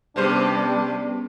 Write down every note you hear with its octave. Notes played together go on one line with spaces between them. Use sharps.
G2 C3 G3 B3 C#4 D4 G#4 C5